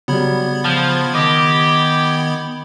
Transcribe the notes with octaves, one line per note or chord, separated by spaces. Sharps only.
C#3 F#3 G3 B3 B5 G#6
F3 A5 F6 G6
D#3 G4 D#5 D6